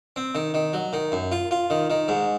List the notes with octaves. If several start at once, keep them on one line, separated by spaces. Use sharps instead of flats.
C4
D#3
D#3
F#3
D#3
F#2
F4
F4
D#3
D#3
G#2